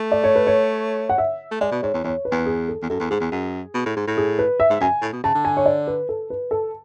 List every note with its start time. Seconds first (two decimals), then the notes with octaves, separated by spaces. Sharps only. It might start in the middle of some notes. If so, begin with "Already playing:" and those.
Already playing: A3
0.12 D5
0.24 C#5
0.36 B4
0.47 C#5
1.09 F#5
1.18 E5
1.52 A3
1.61 G#3 D5
1.71 B2
1.83 G#2 C#5
1.94 E2
2.04 E2 C#5
2.25 B4
2.32 E2
2.46 G#4
2.68 A4
2.82 E2
2.90 F#2 A4
3.00 E2
3.10 G#2 G#4
3.21 E2
3.32 F#2
3.74 B2
3.86 A2
3.97 G#2
4.08 A2
4.17 G#4
4.39 B4
4.60 E5
4.70 G#2
4.80 F#2 G#5
5.02 A2
5.13 B2
5.24 C#3 A5
5.35 D3
5.45 G#5
5.57 C#5
5.66 D5
5.88 B4
6.09 A4
6.30 B4
6.51 A4